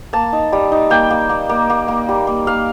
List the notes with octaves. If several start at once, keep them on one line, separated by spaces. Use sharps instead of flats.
A#3 A5
D#4
G3
D#4
A#3 G5
A#3
A#3
A#3
A#3
A#3
G3
A#3
A#3 F5